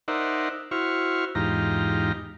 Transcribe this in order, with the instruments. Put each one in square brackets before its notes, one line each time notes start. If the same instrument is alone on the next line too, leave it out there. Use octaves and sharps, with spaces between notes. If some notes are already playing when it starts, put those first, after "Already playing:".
[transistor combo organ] D#4 A#4 C5 D5 E5 F#5
E4 F#4 C5 C#6 F6
E2 G#2 D#4 F4 G4 A#5